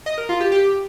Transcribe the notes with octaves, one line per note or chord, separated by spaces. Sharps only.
D#5
A#4
F4
G4
G4